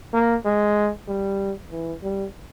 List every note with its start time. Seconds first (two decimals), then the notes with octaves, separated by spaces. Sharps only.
0.13 A#3
0.45 G#3
1.08 G3
1.71 E3
2.03 G3